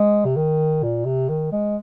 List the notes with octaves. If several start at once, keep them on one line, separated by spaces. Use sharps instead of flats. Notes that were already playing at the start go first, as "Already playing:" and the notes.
Already playing: G#3
C3
D#3
A#2
C3
D#3
G#3